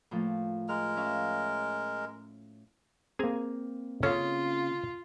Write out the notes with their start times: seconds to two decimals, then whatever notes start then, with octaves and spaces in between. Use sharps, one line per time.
0.11 A2 F3 A#3
0.69 G#3 A#4 F6
0.96 C#4 E5 F5
3.19 A#3 C4 G#4 G#5 A#5
4.03 C#3 C#4 F4 A4